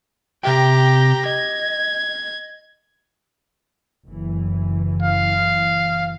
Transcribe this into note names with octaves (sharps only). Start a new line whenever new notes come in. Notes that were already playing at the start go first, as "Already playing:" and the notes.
C3 G4 E5 G5 A#5
D#5 G#6
F#1 E3
F5